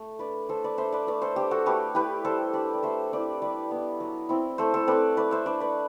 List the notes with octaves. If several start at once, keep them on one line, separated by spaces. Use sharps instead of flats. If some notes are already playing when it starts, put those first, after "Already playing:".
Already playing: A3
D4 B4 D5
A3 A4 C5
B4 D5
D4 C5 E5
B4 D5
A3 B4 D5
A4 C5
D4 G4
F#4 A4
A3 G4 B4
E4 G4 B4
G3 A4 C5
D4 B4 D5
D5
A3 C5 E5
C4 E4 B4 D5
G3 B4 D5
B3 E4
F#3
C4 E4
A3 A4 C5
A4 C5
C4 E4 B4 D5
A3 B4 D5
C5 E5
D4 B4 D5
B4 D5